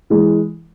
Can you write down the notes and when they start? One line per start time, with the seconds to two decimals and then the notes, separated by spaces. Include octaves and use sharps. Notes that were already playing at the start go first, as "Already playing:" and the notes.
0.10 E3 G#3